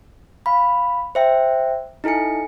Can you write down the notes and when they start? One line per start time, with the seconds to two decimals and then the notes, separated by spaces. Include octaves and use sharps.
0.46 F5 B5
1.15 C5 E5 G5
2.04 D#4 E4 A4 G#5 C#7